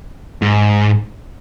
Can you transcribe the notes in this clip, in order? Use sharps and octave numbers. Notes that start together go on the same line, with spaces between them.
G#2